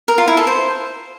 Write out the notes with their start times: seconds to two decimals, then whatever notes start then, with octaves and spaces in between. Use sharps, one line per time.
0.08 A#4
0.18 F4
0.28 E4
0.37 A4
0.47 C5